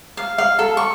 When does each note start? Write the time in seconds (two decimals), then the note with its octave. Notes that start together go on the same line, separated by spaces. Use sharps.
0.17 F5
0.38 F5
0.59 A4
0.77 C#6